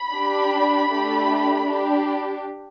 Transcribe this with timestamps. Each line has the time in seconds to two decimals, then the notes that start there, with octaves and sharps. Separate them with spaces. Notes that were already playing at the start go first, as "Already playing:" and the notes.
Already playing: B5
0.14 D4 G4
0.90 A3 D4 G4
1.66 D4 G4